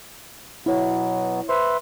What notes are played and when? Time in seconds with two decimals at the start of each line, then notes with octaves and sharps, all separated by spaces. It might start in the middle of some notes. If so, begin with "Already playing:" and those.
0.66 B2 F#3 B3 E4 C#5
1.49 B4 C5 E5 C6